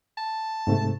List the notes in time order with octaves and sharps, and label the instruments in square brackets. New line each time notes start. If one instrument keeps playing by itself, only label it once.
[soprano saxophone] A5
[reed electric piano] G#2 C3 A3